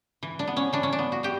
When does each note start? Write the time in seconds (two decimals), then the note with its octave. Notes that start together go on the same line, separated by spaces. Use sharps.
0.23 E3
0.39 D4
0.47 B3
0.57 C#4
0.73 E3 D4
0.83 C#4
0.92 D4
0.99 B3
1.12 F#4
1.23 E3 G4